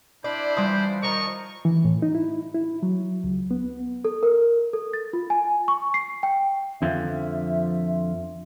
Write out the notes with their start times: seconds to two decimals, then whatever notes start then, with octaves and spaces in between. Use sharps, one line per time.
0.24 D4 E4 C5 D5 B5
0.57 E3 F3 G3 C6 D#6
1.03 D#3 F3 D#5 A#5 C#6
1.65 E3
1.85 A2
2.02 D#4
2.15 E4
2.55 E4
2.83 F#3
3.24 C#2
3.51 B3
4.05 A4
4.23 A#4
4.73 A4
4.93 A6
5.13 F4
5.30 G#5
5.68 C#6
5.94 C7
6.23 G5
6.82 F2 D3 F3 E5